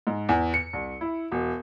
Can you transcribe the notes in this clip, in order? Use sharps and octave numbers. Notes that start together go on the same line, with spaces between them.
G#2
E2
C#7
C2
E4
E1